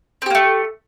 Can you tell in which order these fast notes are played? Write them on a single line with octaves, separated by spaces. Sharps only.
C4 G4 A#3 A3